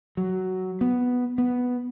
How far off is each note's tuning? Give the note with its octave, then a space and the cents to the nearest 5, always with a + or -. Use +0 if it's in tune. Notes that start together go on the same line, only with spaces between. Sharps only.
F#3 +10
B3 +0
B3 +0